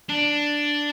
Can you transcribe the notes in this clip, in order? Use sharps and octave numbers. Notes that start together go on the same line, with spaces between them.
D4